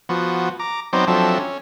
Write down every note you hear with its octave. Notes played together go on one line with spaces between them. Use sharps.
F3 B3 F#4
A#5 D6
F#3 B3 C4 D#4 C5 D5
F3 F#3 C4 D4 A4 E5
C#4